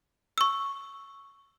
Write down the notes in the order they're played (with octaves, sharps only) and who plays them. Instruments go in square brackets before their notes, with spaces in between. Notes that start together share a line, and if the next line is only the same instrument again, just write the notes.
[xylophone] C#6 E6